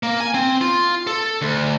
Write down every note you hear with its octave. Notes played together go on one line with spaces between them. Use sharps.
A#3
G#5
C4
F4
A4
D2